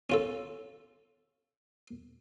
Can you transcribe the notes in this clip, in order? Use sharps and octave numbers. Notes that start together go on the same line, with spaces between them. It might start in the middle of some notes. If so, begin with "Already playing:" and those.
C#4 F4 A4